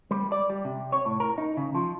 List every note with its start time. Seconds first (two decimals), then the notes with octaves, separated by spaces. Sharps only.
0.11 G3
0.32 D5
0.50 G3
0.65 C3
0.92 C#5
1.06 A2
1.20 A#4
1.38 D#4
1.57 C#3
1.75 F3